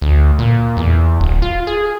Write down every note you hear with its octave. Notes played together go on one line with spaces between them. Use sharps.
D2
A#2
E2
D1
F4
G#4